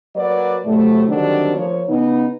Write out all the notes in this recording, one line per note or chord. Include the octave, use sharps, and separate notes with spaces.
F#3 A#3 A#4 B4 D5
A2 C3 F#3 A3
D3 D#3 F#3 G3 C4 D4
F3 A#3 C#5
C#3 B3 D#4